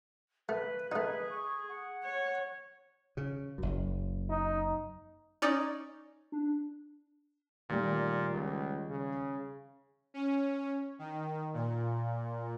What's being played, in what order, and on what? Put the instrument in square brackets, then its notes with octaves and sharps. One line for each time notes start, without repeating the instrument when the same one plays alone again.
[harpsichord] A3 [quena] B4
[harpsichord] A3 D#4 [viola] G#4 [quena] B4
[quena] C#6
F#5
[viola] C#5
[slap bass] C#3
F#1 F#2
[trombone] D#4
[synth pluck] C#4 D#4 D5
[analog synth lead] D4
[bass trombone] A#2 [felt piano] D#3 G3 A3
[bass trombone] C#2
C#3
[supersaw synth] C#4
D#3
A#2